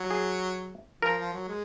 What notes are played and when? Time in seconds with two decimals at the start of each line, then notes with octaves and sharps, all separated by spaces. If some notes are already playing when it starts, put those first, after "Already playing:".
Already playing: F#3
0.11 G#4
1.02 F3 A#4
1.18 F3
1.33 F#3
1.48 G#3